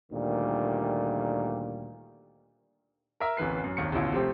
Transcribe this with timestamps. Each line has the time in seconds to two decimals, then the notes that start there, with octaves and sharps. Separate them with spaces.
0.12 D2 A#2 D#3 G3
3.20 A#4 E5 A#5
3.37 D1 A1 E3 B4 C7
3.64 F#2
3.77 G#1 D#2 D#3 C#7
3.92 A1 D2 B2 E4 F4
4.13 C3 F3 A3 C4 G4